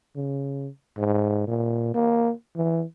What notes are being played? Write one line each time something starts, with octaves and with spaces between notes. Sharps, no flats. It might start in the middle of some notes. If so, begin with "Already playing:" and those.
C#3
G#2
A#2
A#3
E3